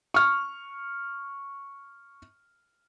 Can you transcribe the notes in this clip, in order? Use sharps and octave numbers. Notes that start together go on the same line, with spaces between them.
C#6 F6